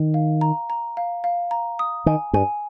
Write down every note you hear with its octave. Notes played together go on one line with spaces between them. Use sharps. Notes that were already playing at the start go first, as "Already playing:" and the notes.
Already playing: D#3
F5
A#5
A#5
F5
F5
A#5
D#6
D#3 G#5
G2 G#5